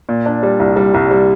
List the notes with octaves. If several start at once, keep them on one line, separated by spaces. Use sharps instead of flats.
A#2
D4
G3
C2
G3
C2
G3